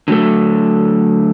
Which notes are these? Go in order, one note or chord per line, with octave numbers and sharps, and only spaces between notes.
D3 F#3 A3 A4